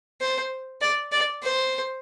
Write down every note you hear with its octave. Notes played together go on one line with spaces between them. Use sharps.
C5
D5
D5
C5